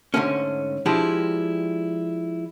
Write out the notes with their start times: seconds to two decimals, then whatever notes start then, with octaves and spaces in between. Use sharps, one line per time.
0.14 G#2 D3 A3 C#4
0.86 F3 G#3 D4 E4 G4